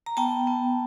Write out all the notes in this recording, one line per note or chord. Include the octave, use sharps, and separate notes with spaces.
A#5
B3 G5 A5
B3